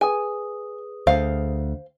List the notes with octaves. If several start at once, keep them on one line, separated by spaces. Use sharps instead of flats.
G#4 B4 G#5 D#6
D2 C5 F5